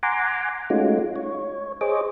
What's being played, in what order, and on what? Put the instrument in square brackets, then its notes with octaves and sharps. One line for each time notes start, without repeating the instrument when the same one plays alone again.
[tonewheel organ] F#5 G#5 A#5 C6 D6
G#3 A3 C#4 D#4 F4 F#4
C#5
G#4 C5 C#5 D#5 D6